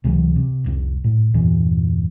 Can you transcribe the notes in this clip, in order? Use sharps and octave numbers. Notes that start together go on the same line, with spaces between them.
C#2 C3 E3 F#3
C3
F1 C2
A2
E2 G2 A#2 E3